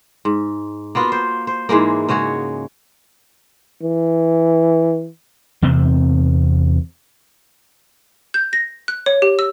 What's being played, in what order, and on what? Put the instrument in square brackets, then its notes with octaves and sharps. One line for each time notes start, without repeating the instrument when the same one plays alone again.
[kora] G#2
A#3 B3 F4 F#4
C5
C5
G#2 E3 G#3 A#3
C#3 G#3 F#4 C#5
[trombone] E3
[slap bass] E2 C3 C4
[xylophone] G6
A#6
F#6
C#5
G4
E6